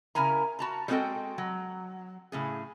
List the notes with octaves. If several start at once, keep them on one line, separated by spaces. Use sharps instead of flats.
C#3 E4 A#4 G#5 A#5
F#4 A5 A#5
G3 G#3 C4 F#4 A4 G5
F#3
A2 C#3 G#4